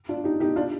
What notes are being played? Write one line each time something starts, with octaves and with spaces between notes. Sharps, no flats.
D4 F4
D#4 G4
D#4 G4
D4 F4